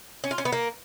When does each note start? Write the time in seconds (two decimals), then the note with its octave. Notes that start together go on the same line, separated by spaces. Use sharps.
0.24 C#4
0.31 F4
0.38 C#4
0.45 B3
0.53 A#3